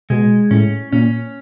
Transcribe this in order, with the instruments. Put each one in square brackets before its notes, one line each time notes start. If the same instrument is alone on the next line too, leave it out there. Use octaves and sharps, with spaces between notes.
[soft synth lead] B2 [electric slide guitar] G#3
[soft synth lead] A2 [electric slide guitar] C#4
[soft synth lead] A#2 [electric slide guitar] C#4